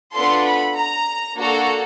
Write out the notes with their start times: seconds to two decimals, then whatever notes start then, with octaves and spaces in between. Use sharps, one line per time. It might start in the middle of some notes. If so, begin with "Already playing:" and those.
0.13 B3 D4 F4 A4 C6
0.45 B5
0.76 A#5
1.38 A#3 D4 F#4 A4 A#5